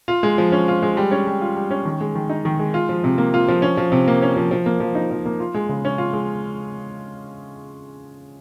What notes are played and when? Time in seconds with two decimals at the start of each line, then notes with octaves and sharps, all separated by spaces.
0.08 F4
0.23 G#3
0.38 F3
0.52 C#4
0.68 F4
0.82 G#3
0.97 G3
1.11 C#4
1.27 G3
1.41 F4
1.57 G3
1.71 C#4
1.85 D#3
2.01 G#3
2.15 D#3
2.29 D#4
2.45 D#3
2.59 G#3
2.74 F4
2.89 F3
3.04 C3
3.18 A#3
3.34 F4
3.48 F3
3.62 C#4
3.77 F3
3.92 C3
4.08 A#3
4.22 C#4
4.36 F3
4.51 F3
4.66 A#3
4.80 F3
4.95 D#4
5.11 F3
5.25 A#3
5.40 F4
5.54 G#3
5.69 C#3
5.85 C#4
5.98 F4
6.13 G#3